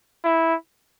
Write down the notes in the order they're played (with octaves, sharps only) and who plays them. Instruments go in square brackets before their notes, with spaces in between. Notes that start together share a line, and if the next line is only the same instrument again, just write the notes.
[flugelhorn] E4